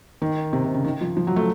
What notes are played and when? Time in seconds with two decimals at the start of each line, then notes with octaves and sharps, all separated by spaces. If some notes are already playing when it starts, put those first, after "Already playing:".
0.22 D#3
0.53 C3
0.64 C3
0.74 C#3
0.84 D#3
1.01 F3
1.17 F3
1.27 F#3
1.36 A3